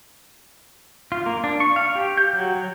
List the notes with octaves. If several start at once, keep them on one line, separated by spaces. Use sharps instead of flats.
F4
A#3
D4
C#6
F5
G4
G6
F#3
F#3